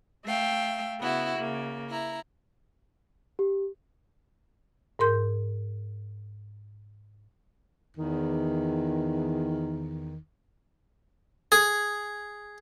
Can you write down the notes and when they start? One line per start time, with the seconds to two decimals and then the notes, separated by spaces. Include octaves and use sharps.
0.24 A3 E5 F5 G5
0.99 C#3 B3 E4 F#4
1.35 C#3 A#3
1.89 E4 A#5
3.39 G4
4.99 G#2 A#4 C6 G6
7.97 E2 D#3
11.52 G#4